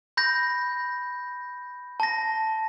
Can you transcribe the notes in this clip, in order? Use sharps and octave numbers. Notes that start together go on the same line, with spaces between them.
B5 G6 A#6
A5 A#6